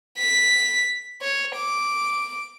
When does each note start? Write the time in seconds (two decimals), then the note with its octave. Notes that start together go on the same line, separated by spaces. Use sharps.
0.19 B6
1.22 C#5
1.56 D6